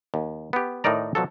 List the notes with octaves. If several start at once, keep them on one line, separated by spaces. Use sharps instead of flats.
D#2
B3 G4
A2 D#3 D#4 A#4 D5 A#5
B2 F3 F#3 A4